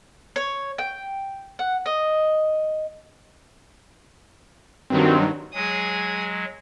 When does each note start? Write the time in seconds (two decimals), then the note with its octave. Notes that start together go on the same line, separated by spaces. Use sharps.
0.36 C#5
0.78 G5
1.59 F#5
1.86 D#5
4.90 G2 D#3 F#3 C4
5.54 F#3 G#3 G#4 D#6